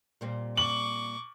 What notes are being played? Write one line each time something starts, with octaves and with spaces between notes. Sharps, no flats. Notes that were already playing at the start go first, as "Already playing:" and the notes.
A#2 G3 C4
C#6 D6 F#7